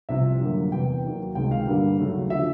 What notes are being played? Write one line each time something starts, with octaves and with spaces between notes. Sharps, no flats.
C2 C3 F3 E5
F#2 D3 G3 A#3
E2 C3 E3 G5
D#2 D#3 F#3 A#3
C#2 C3 D#3 G#3 G5
F5
G2 D3 G3 A#3
D#2 C#3 F#3 A3
D3 F3 E5